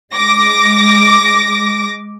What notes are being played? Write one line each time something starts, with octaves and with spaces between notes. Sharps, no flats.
G#3 D6 A#6